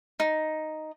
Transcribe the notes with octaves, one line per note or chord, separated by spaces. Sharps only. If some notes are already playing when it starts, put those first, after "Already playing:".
D#4